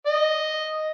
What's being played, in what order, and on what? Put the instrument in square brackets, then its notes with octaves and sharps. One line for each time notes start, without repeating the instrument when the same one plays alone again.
[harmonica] D#5